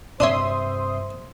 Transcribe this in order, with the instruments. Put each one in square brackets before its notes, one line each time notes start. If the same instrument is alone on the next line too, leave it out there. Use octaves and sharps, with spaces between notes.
[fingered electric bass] G2 C3 [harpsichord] D4 C#5 [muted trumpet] C5 [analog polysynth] E5 C6 D#6